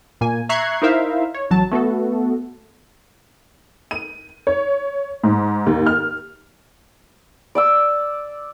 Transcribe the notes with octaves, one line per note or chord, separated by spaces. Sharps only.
A#2 A#3 G#5
E5 A#5 C#6 F#6 G#6 C7
D#4 E4 A#4 C5 E5 F5
C#5
A1 F#3 A5
A3 B3 F#4 A4
D#7
C#5
G#2
D#2
F6
D5 D6 E6